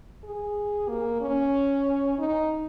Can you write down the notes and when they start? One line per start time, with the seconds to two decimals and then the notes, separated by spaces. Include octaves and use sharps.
0.24 G#4
0.89 A#3
1.21 C#4
2.19 D#4